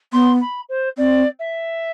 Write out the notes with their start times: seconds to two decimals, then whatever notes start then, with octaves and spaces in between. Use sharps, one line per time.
0.12 B3 C6
0.41 B5
0.69 C5
0.97 C4 D5
1.39 E5